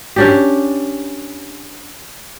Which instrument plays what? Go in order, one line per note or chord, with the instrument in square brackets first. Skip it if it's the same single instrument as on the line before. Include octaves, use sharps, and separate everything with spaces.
[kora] C#4 D4 G4